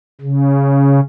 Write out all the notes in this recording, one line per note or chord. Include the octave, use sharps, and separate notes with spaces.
C#3